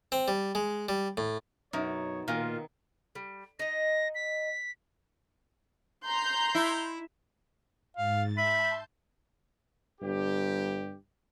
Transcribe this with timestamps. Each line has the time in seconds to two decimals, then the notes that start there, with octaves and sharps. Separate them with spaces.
0.12 C4
0.28 G3
0.55 G#3
0.89 G3
1.17 A2
1.73 F#2 B2 D#4 C#5
2.28 A#2 D#3 F4
3.15 G3
3.59 D#4 D#5 A#6
4.15 B6
6.05 A#5 C6 G6
6.55 E4
7.97 G#2 F5 A6
8.37 E5 A5 B5 C6 G6
10.01 G1 G2 G4